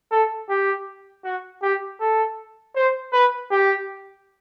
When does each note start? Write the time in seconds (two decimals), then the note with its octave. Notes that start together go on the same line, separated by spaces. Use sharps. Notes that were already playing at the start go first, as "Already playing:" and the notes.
0.11 A4
0.49 G4
1.24 F#4
1.62 G4
2.00 A4
2.76 C5
3.13 B4
3.51 G4